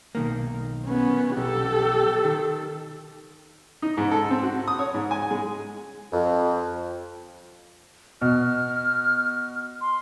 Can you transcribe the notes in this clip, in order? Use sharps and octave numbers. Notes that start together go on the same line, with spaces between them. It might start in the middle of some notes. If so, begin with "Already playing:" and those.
B1 D#3 A#3
B3 C#4
B1 G4 A4
D#3
D#4
G#2
A4
C4
F#4
D#6
C#5
G#2
G#5
G#3
F2
B2 F6
C6